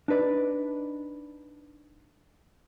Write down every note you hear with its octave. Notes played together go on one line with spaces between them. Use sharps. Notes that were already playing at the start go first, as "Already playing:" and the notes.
D4 D#4 B4 D5